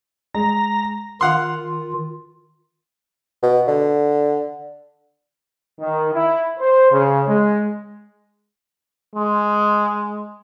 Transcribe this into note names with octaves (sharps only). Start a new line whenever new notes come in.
G#3 A#5
D#3 F4 F5 F#5 C6
B2
D3
D#3
E4
C5
C#3
G#3
G#3